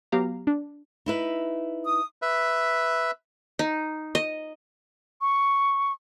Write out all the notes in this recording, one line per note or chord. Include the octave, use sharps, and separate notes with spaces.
F#3 B3 G4 F5 A#5
D4
D#4 E4 B4
D#6
B4 E5
D#4
D#5
C#6